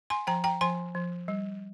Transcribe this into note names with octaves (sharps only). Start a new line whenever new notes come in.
G#5 C6
F3 G5 A#5
G5 A#5
F3 G#5 C6
F3
G3